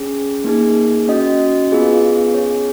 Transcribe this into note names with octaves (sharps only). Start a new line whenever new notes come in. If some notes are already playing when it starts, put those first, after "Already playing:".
Already playing: C#4 G#4
A#3 D#4 G#4
C#4 F#4 D#5
B3 F4 G#4
C#4 G#4 C#5